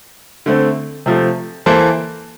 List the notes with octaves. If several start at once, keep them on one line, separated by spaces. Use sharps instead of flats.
D3 A3 C4
C3 F3 A3
E3 A#3 E4 A4 C5